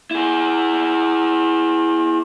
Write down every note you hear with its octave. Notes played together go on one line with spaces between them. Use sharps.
E4 G#4